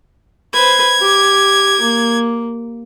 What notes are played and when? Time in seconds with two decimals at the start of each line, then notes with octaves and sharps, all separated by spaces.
0.53 B4 C5 G#6
1.00 G4
1.80 A#3